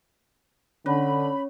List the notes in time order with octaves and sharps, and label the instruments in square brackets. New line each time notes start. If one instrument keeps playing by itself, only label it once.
[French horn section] D3 [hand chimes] C#4 C#5 [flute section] B5